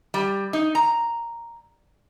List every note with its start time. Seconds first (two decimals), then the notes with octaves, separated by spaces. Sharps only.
0.14 G3
0.53 D#4
0.75 A#5